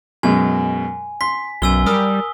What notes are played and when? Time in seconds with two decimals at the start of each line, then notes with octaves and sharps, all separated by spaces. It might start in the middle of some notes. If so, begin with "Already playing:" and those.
0.23 F#2 B2 G#3 G#5
1.21 C6 B6
1.62 B1 F#2 G#5 E6 G7
1.86 G3 A#4 D#6